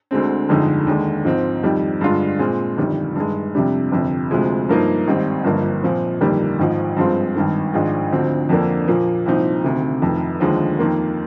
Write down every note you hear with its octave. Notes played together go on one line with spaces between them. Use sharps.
D2 D3 G#3 C4
G1 F2 D3 G#3 D#4
D#2 D3 G#3 D4
G#2 F3 C4
F2 D#3 G3
G2 D3 G#3 D4 F4
A#2 G#3 C4
G1 F2 D#3 G3
G2 D#3 G#3
F2 C3 G3 D4
G1 F2 C3
D2 C3 F3 G#3
G2 F3 A#3 D#4
G#1 G#2 G3 C4
G1 G2 F3 A#3
A#2 F3 C4
G1 F2 D#3 G3 A#3
G#1 G#2 F3
G2 F3 G#3 C4 F4
G#1 G2 D#3
G#1 G#2 F3 G#3 D4
D2 D3 F3 C4
F2 D3 F3 A#3 D4
A#2 F3 A#3
C2 A#2 F3 C4 D#4
D2 C3 D#3
F1 F2 D#3
D#2 D3 F3 G#3
F2 D#3 A#3 F4